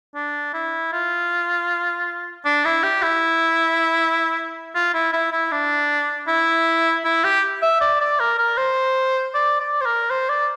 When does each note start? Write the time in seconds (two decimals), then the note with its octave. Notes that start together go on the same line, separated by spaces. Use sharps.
0.15 D4
0.54 E4
0.93 F4
2.45 D4
2.65 E4
2.83 G4
3.02 E4
4.75 F4
4.94 E4
5.13 E4
5.32 E4
5.52 D4
6.28 E4
7.05 E4
7.24 G4
7.62 E5
7.81 D5
8.00 D5
8.20 A#4
8.38 A#4
8.57 C5
9.34 D5
9.60 D5
9.81 C5
9.85 A#4
10.10 C5
10.29 D5